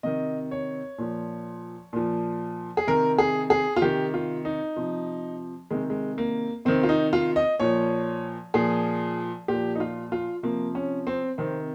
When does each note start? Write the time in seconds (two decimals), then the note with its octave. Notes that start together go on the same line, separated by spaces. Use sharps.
0.03 C3 D#3 D#5
0.51 C#5
0.98 A#2 F3
1.93 A#2 F3
2.77 G#4
2.87 C3 D#3 A#4
3.18 G#4
3.50 G#4
3.76 F4
3.82 C3 D#3 G4
4.14 F4
4.45 D#4
4.76 C3 F3
5.71 C3 D#3 G#3
5.90 G#3
6.18 A#3
6.65 C3 D#3 C4
6.83 F4
6.89 D#4
7.13 F4
7.36 D#5
7.60 A#2 F3 C#5
8.54 A#2 F3 G#4
9.48 A#2 F3 G4
9.75 D#4
9.80 F4
10.12 F4
10.43 C3 F3 A#3
10.75 C#4
11.07 C4
11.38 C3 D#3 C4